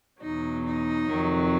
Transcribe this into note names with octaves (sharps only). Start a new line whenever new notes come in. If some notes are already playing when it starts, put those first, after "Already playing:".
E2 B2 F#3 D#4
D#4
F2 C3 D#3 F#3